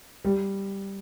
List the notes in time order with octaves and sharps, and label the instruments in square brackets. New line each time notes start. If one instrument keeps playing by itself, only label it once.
[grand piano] G3